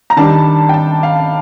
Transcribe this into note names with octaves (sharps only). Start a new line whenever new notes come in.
A#5
D#3 G3 D4 A5
G5
A5
F5